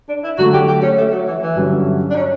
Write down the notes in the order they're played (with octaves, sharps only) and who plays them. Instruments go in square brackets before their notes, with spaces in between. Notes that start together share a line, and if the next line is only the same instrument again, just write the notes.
[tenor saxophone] D4
E4
[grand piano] D3 F#3 A3 [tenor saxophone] F#4
[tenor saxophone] G4
G4
C#4
A3
F#3
E3
E3
[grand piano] G2 D3 F#3 C#4
[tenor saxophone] D4
C#4